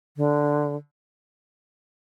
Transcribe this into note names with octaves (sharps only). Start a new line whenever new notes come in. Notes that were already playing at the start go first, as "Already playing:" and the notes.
D3